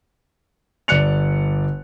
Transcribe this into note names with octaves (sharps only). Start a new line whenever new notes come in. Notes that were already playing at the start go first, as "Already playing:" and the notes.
G1 D5 F#6 C#7 F7